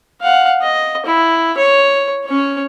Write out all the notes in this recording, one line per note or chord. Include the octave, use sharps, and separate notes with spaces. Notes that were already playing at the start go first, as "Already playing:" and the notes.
F5 F#5
D#5
E4
C#5
C#4 C#5